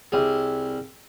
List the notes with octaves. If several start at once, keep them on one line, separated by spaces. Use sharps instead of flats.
C2 G#4